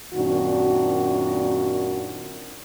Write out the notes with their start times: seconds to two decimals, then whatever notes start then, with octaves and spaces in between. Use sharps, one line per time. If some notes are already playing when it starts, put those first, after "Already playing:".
0.15 F#2 A#2 D#3 C4 D4 F#4